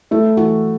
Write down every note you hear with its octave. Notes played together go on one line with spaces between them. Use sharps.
A3 E4
E3 F#4